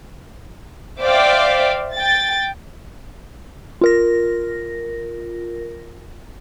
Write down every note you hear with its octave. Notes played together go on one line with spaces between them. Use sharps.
C5 D5 E5 F5 G5 D6
G5 A6
F4 A#4 A#6